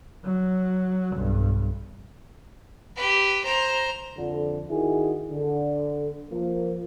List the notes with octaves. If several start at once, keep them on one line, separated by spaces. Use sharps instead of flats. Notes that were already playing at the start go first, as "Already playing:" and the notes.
F#3
B1 G2
G4 B4
C5 A#5
F2 D3
D#3 E4 F#4 G#4
D3
F3 A#3